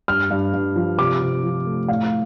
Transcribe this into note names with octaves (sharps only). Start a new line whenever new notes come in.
G2 F6
G2
G2
F3
C3 D6
C3
F3
A3
A2 F5